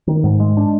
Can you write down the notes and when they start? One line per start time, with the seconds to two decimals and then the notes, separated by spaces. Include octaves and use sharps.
0.07 D#3
0.24 G#2
0.40 G#3
0.57 D4